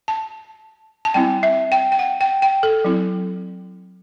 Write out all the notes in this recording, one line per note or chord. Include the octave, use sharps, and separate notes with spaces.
A5
A5
G3 C4 E4 G5
E5
G5
G5
F#5
G5
G5
A4
F#3 C4 E4